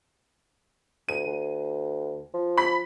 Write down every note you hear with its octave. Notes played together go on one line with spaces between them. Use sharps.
D2 D#7
D2
F3
B5 B6